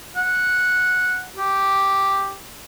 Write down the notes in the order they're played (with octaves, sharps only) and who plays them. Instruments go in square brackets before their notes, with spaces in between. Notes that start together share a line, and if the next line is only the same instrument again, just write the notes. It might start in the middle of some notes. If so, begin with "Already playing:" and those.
[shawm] F#5
G4